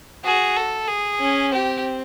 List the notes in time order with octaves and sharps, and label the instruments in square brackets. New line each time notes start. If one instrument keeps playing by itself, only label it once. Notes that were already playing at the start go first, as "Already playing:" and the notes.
[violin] F#4 [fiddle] G#4
[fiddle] A4
G#4
[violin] C#4
[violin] C4 [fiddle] G4